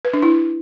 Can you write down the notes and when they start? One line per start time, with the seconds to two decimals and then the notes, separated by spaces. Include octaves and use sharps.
0.05 B4
0.14 D4
0.22 E4